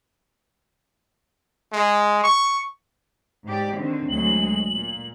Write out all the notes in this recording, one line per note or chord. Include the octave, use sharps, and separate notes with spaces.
G#3
C#6
G#2 G4 D5
D3 D#3 C4
D2 F#3 G#3 F#7
A#2